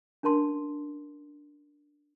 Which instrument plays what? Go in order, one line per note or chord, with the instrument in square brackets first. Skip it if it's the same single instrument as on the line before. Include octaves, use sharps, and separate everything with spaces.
[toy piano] C#4 D4 A#4 A5 C6